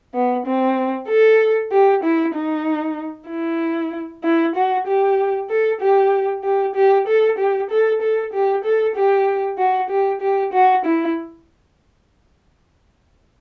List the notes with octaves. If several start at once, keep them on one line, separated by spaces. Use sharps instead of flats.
B3
C4
A4
G4
E4
D#4
E4
E4
F#4
G4
A4
G4
G4
G4
A4
G4
A4
A4
G4
A4
G4
F#4
G4
G4
F#4
E4